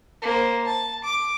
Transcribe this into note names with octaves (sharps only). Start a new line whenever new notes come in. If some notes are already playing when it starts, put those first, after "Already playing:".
A#3 C5
A5
D6